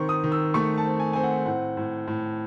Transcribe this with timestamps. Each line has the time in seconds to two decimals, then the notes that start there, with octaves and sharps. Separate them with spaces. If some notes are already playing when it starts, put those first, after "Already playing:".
Already playing: D#3 C4 C#6
0.09 D#6
0.24 D#3
0.32 E6
0.54 A3 C#6
0.78 A5
0.85 C4
1.00 G#5
1.13 C4 G#5
1.23 F#5
1.46 A2 F#5
1.77 A2
2.07 A2